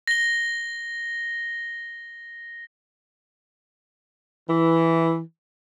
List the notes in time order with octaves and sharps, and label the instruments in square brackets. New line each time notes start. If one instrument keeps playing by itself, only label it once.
[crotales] A#6 G7
[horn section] E3